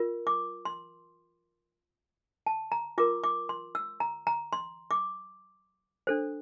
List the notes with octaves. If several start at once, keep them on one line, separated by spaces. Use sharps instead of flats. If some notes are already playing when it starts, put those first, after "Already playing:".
Already playing: F4 A#4
D6
C6
A5
A#5
F4 A#4 D6
D6
C6
E6
A#5
A#5
C6
D6
D4 A4 C5